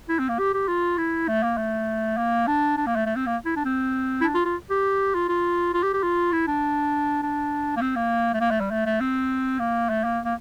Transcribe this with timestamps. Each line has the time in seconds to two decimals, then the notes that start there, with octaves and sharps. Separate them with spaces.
0.09 E4
0.19 C4
0.29 A#3
0.39 G4
0.54 G4
0.68 F4
0.98 E4
1.28 A3
1.43 A#3
1.57 A3
2.17 A#3
2.47 D4
2.77 D4
2.86 A#3
2.96 A3
3.06 A3
3.16 C4
3.26 A#3
3.45 E4
3.56 D4
3.65 C4
4.21 E4
4.24 D4
4.35 F4
4.45 F4
4.70 G4
5.14 F4
5.29 F4
5.74 F4
5.83 G4
5.94 G4
6.03 F4
6.32 E4
6.47 D4
7.23 D4
7.76 A#3
7.81 C4
7.96 A#3
8.34 A3
8.41 A#3
8.51 A3
8.60 G3
8.71 A3
8.86 A3
9.00 C4
9.60 A#3
9.89 A3
10.04 A#3
10.25 A#3